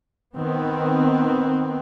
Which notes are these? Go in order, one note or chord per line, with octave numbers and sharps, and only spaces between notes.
D#3 B3 C4